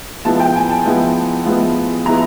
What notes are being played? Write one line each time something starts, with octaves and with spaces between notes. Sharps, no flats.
F3 G#3 B3 E4 A5
G5
G#5
A5
F3 G#3 B3 E4
F3 G#3 B3 E4
F3 G#3 B3 E4 A#5